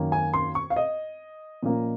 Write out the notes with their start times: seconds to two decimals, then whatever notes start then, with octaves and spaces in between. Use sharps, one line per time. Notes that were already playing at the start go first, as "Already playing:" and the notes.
Already playing: F#2 D#3 A#3 C#4
0.12 G#5
0.34 C6
0.55 C#6
0.70 F5
0.76 D#5
1.63 A#2 F3 A#3 C#4